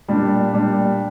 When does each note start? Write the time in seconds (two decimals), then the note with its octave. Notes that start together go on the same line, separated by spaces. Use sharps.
0.08 A#2 G3 D4
0.53 A#2 G3 D4